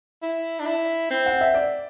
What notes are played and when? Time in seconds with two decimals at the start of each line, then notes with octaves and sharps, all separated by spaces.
0.22 E4
0.59 D4
0.66 E4
1.10 C4
1.26 F#5
1.41 E5
1.54 D5